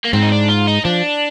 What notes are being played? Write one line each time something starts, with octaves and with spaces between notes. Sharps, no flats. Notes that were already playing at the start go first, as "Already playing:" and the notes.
A#3
G#2 C4
D#4
D4
F4
D#4
F3 D4